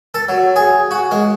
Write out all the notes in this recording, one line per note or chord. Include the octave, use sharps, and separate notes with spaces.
A4
F#3
G#4
F#4
G#3